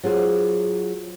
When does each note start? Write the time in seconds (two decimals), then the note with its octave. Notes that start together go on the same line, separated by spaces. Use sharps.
0.03 F#3 F4 G#4 C5